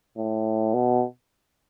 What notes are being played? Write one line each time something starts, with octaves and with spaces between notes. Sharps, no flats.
A2
B2